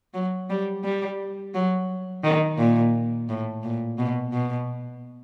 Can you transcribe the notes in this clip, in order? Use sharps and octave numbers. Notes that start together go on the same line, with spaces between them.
F#3
G3
G3
F#3
D#3
A#2
A2
A#2
B2
B2